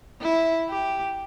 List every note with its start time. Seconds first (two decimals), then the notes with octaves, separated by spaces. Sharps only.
0.21 E4
0.69 G4